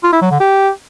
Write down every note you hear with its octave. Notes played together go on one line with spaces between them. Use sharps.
F4
E4
F#3
D3
G4